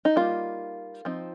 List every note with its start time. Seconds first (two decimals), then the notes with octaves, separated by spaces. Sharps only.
0.05 D#4
0.16 G3 A#3 D#4 F4
1.05 F3 C4 D#4